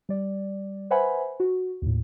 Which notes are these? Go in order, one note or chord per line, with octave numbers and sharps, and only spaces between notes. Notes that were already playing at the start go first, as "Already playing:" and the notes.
G3 D5
B4 C5 E5 F#5 G#5 B5
F#4
D#2 A2